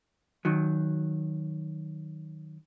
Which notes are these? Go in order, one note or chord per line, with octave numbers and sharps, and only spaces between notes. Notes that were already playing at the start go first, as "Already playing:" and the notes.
D#3 F#3